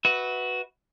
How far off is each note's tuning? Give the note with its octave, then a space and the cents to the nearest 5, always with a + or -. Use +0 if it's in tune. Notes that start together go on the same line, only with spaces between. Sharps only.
F#4 +0 B4 +0 E5 -30